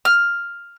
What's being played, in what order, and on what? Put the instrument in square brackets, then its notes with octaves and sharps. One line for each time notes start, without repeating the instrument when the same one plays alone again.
[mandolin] F6